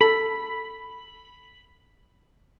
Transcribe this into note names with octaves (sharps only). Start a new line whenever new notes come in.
A4 B5